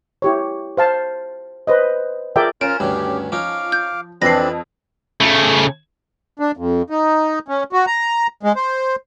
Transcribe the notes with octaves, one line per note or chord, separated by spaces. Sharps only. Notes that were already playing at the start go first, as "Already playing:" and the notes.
E4 G4 C#5
C5 F5 A5
B4 C5 D#5
F4 G#4 A#4 D5 E5 G5
C#4 F4 A#4 C5 F6 D7
D2 G2 D#3 G4
F3 C#4 D#4 F5 D6
G6
F2 E3 C4 D4 B4 A#6 C7
C#3 A3
D4
F2
D#4
C#4
F#4
A#5
G#3
C5